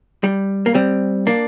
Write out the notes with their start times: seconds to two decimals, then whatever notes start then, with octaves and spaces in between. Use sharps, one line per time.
0.24 G3
0.66 A#3
0.75 G3 C4
1.27 A#3 D4